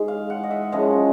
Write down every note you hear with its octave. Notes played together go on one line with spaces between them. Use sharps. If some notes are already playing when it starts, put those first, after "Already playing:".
Already playing: G#2 G#3
F5
F#5
D#5
E5
F#2 C#3 F3 G#3 D#5